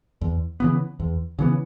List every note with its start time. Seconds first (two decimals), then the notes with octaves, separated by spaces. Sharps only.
0.21 E2
0.60 C#3 E3 B3
1.00 E2
1.39 C#3 E3 B3